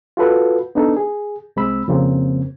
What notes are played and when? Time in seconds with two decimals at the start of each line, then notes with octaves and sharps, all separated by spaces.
0.17 F4 F#4 A4 B4
0.75 B3 D4 D#4 A4
0.97 G#4
1.56 C2 G#3 C4 B5 E6
1.88 F2 C#3 A#3 C4